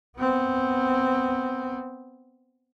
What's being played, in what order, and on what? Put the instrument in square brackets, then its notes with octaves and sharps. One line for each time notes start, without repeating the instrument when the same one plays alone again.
[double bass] B3 C4